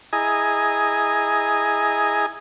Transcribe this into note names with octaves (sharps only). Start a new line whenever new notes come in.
E4 G#4 D#5 G#5 A#5